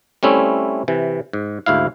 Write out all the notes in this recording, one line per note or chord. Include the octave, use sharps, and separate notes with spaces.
G3 A3 C4 C#4 E4
C3 E3
G#2
D2 G#2 E4 F5